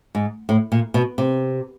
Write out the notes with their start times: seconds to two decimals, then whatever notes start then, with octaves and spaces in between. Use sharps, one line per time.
0.15 G#2
0.49 A2
0.72 A#2
0.94 B2
1.18 C3